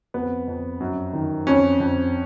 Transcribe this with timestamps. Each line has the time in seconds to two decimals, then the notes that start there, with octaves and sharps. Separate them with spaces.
0.14 F2 B3
0.48 F2
0.80 F#2
1.13 D#3
1.47 F2 C#4
1.80 F2